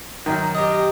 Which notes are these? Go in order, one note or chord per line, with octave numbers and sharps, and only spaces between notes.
F#2 D#3
G4 D#5